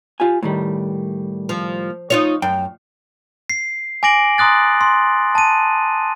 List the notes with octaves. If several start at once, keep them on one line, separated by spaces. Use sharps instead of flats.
F4 G4 G#5
A2 D#3 G3
F3
D#4 F4 C#5
F#2 G5
C7
G#5 D6 A#6 D7 F#7
A#5 C6 D#6 F#6 A6
C6
A5 D#7